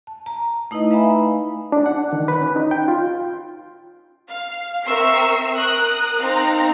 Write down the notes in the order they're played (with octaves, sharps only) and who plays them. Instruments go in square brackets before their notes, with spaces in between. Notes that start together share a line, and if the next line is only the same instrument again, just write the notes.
[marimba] A5
A#5
A3 D#4 E4 B4 D#5
B4 E5 F5 G#5 A#5 B5
[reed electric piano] D4
F#5
D#3
B4
C#4
D#4
G5
F4
[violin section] F5
C4 A#4 E5 C#6 E6 C7
A#4 D#6 F#6
C4 D#4 F5 A#5